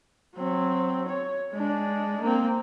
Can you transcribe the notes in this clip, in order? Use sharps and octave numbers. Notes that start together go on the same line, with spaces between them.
F#3 C4
C#5
G#3 D4
A#3 C4